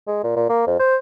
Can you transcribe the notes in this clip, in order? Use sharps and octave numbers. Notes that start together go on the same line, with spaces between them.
G#3
A#2
A#2
A#3
F2
C5